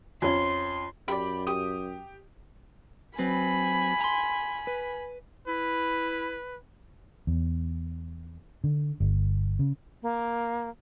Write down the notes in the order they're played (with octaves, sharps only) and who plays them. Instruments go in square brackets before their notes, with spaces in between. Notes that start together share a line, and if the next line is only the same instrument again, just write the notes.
[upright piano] F2 C#4 [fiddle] C6
[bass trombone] F#2 [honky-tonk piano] G4 D5 [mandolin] B5
[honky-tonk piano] G4 [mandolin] D#6
[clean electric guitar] F#3 C4 B4 [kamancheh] G#5 B5
[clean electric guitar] A#5 C6
B4
[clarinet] E4 [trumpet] B4
[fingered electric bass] E2
D3
G1
C#3
[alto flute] A#3